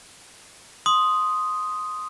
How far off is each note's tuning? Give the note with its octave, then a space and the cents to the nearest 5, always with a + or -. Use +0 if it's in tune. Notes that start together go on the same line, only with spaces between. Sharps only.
C6 +0 D#6 +0